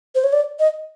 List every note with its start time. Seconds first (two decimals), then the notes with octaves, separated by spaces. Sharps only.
0.15 C5
0.24 C#5
0.33 D5
0.60 D#5